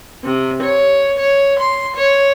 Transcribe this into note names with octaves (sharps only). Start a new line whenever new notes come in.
C3
C#5
C#5
C6
C#5